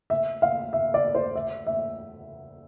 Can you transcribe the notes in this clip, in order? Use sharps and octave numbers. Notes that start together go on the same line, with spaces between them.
E5
F5
E5
D5
C5
E5
E5